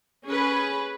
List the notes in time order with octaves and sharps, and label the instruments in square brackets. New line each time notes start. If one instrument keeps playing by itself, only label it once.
[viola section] C#4 G#4 B4